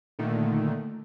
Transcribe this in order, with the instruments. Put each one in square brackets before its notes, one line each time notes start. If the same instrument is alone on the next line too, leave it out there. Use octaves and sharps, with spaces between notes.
[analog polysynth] A#2 D3 D#3 A3